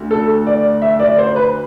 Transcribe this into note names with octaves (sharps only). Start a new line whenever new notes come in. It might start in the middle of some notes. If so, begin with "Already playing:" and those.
Already playing: D2
A4
D5
E5
D5
C5
B4